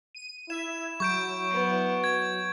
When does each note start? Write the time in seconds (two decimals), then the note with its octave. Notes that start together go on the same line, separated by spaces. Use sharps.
0.15 D#7
0.50 E4 E5 G#6 E7
1.00 F#3 C#6 G6 D7
1.51 B3
2.04 G#6